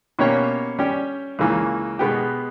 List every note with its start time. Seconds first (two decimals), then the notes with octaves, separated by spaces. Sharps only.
0.19 B2 A#3 C#4 G4 C#5
0.79 G3 C#4 G4
1.39 C#2 C#3 E3 A#3
1.99 B2 G#3 B3 G4